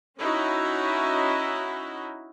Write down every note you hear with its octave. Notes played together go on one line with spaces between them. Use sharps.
C#4 D#4 E4 F#4